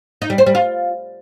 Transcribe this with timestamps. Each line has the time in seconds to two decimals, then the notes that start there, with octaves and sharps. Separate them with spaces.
0.22 D#4
0.30 G3
0.38 C5
0.46 G3
0.55 F4